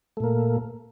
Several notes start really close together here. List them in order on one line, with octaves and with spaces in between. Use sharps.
A3 A#2 A#3